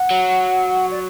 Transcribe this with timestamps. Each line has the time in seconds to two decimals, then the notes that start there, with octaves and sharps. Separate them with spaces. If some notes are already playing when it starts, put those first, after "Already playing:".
Already playing: F#5
0.11 F#3
0.91 D5